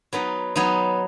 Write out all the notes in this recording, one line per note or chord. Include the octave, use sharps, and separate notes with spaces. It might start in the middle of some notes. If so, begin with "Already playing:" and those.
F#3 B3 D#4
F#3 B3 D#4